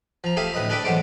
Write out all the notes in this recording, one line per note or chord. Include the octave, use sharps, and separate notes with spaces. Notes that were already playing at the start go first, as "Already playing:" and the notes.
F3 A#5
A3 G4 G#4 E5 F5 G#5
D2 A2 B4 D#5 B5
G#4 A4 B4 D5 E5 G5
A1 B2 F#3 G#3 C5 D6